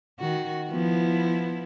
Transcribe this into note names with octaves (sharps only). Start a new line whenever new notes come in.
D#3 F#4
F3 B3 E4